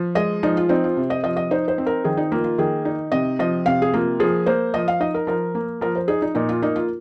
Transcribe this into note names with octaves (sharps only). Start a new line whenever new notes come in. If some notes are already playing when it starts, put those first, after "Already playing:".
Already playing: F3
G#3 D#5
F3 D#4
F4
C4 D#4
F4
C3
D#5
F3 D#5
D#5
D#4 C5
C5
C4
A#4
D#3 G#4
D#4
A#3 F4
F4
D#3 G#4
D#4
C3 D#5
F3 D#5
C3 F5
G#4
A#3 F4
F3 G#4
A#3 C5
F3 D#5
F5
D#4 D#5
A#4
F3 A#4
A#3
F3 A#4
C5
D#4 G#4
D#4
A#2 D#4
F4
A#3 D#4
F4